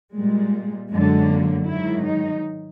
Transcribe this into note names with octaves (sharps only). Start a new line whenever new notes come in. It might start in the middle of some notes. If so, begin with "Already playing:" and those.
A#2 G3 G#3
F#2 D3 F#3 G#3
A#3
G#2 D#3 F#3 E4
D#4